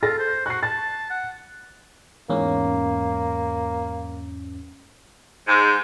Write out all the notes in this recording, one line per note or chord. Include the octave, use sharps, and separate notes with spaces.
F4 A4 A6 A#6
C5
F#4 F#6 C7
A5 A6
F#5
E2 G#2 A#3 C#4
G#2